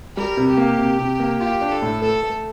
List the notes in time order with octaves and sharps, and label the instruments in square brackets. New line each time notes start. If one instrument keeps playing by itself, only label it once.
[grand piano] G3 [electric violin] A#4
[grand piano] C3
[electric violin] G4
[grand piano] A#3
C3
C3
A#3
[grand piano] F4 [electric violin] G4
[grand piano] D4
[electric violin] A4
[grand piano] A2
[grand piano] A3 [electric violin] A4
[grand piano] A3